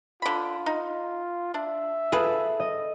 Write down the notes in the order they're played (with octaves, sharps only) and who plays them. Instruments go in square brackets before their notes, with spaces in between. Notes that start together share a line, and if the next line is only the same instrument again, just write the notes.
[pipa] D3 B5 [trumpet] F4
[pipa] D#4
[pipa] D4 [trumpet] E5
[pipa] F4 G#4 B4 [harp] A4
[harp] D#5